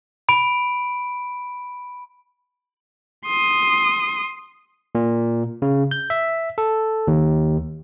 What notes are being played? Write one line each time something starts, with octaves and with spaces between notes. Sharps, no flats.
B5 D7
C6 D#6
A#2
C#3
G6
E5
A4
D#2